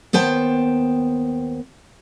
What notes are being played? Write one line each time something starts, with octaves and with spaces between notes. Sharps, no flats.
D#2 B3 C5 G5 A5